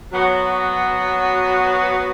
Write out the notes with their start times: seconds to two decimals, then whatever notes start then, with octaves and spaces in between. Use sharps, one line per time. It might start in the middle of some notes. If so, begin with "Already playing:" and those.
0.13 F#3 B3 F#4